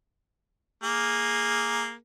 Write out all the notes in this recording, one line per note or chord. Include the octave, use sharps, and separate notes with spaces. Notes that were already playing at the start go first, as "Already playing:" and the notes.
A#3 G#4